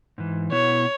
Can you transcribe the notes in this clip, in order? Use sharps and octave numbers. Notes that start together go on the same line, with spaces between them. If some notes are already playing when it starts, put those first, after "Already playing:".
G#2 E3
B2 B3 E4 C#5